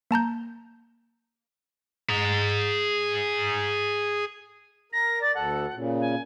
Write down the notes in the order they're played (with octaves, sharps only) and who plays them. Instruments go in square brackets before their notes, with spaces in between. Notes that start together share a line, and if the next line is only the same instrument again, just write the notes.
[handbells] A#3 A5 A#5 G6
[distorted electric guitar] G#4 A#5
[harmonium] A#4 [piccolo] A#6
[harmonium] D5 [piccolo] A6
[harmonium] D2 A4 [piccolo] F#5
[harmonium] A#2 C#3
[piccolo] G#5